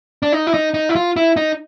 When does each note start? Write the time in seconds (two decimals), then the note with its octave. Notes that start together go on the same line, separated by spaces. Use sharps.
0.23 D4
0.32 D#4
0.47 E4
0.54 D#4
0.74 D#4
0.89 E4
0.96 F4
1.16 E4
1.37 D#4